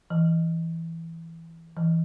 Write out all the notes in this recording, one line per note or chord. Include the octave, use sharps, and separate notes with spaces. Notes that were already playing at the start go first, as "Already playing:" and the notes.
E3
E3